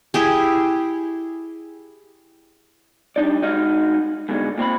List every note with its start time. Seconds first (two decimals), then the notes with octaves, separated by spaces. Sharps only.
0.14 E4 G4 G#4
3.16 G3 D4 D#4 D5
3.42 G#3 D#4 F#4 D#5 F5
4.29 G#2 B2 D3 G#3
4.58 A#2 C4 C#5 B5